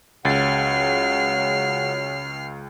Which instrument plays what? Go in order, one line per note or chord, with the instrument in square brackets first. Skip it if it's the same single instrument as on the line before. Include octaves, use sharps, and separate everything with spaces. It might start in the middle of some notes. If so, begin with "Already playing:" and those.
[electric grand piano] C#2 A6 [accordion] C#3 F#5 [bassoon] F#3 [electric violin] F6 C7